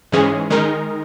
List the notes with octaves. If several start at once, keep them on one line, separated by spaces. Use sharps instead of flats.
G#2 E3 G#3 C#4 G#4
D#3 G#3 D#4 A#4